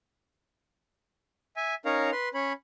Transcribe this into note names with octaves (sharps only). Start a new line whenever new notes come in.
E5 G#5
C#4 D#4 A#4 C#5 F5 A#5
B4 C6
C#4 C#5 B5